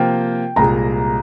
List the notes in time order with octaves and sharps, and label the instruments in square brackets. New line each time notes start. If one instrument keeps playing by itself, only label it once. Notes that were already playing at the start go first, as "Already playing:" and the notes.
Already playing: [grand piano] C3 F3 A#3 F4 [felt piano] G5
[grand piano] C2 A#2 G#3 [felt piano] A#5